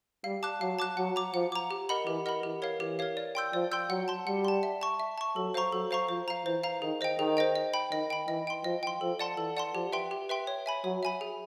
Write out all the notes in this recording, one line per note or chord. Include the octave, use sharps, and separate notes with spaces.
G3 F5
A5 D6 F#6
F#3 F5
A5 D6 F#6
F#3 F#5
A#5 D6
F3 F#5
A#5 D6
G4
A#4 D#5 F#5 B5
E3 G4
A#4 D#5 F#5 B5
E3 G4
A#4 C#5 F5
E3 G4
A#4 C#5 F5
D5
G5 C6 E6 G6
F3 D5
G5 C6 E6 G6
F#3 F#5
A5 C6
G3 F#5
A5 C6
E5
A5 C#6
E5
A5 C#6
F#3 A4
C5 F5 A#5 C#6
F#3 A4
C5 F5 A#5 C#6
F3 C5
F5 A#5
E3 C5
F5 A#5
D#3 G#4
C5 D#5 G5
D#3 G#4
C5 D#5 G5
D#5
G5 B5
D#3 D#5
G5 B5
E3 D#5
G5 C6
F3 D#5
G5 C6
F3 A4
D5 F#5 A5 C6
E3 A4
D5 F#5 A5 C6
F3 G4
B4 E5 G5 C6
G4
B4 E5 G5 C6
C#5
E5 G#5 B5
F#3 C#5
E5 G#5 B5
G#4